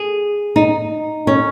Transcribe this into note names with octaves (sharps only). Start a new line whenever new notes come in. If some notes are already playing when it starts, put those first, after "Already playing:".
Already playing: G#4
D#4
C#4